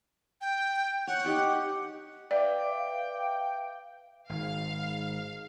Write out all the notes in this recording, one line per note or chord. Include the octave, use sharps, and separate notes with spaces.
G5
C#5 F#5
D#4 G4 G5
B4 D5 E5 F5 G5 D6
G#1 G#2 F5